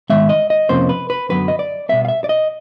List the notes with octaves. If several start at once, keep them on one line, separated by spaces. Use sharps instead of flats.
G#2 D#3 G#3 B3 E5
D#5
D#5
F2 C3 F3 A#3 C#4 C5
B4
B4
F#2 D3 F#3 B3 B4
D#5
D5
B2 G3 B3 E5
F5
E5
D5
D#5